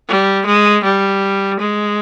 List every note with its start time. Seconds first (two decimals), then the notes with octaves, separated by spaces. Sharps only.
0.08 G3
0.45 G#3
0.84 G3
1.59 G#3